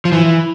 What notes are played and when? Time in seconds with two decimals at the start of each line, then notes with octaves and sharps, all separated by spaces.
0.05 F3
0.12 E3